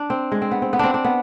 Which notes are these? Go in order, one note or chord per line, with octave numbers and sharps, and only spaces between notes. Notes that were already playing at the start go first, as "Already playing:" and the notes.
Already playing: D4
C4
G#3
C4
B3
C4
B3
C4 D4
D4
B3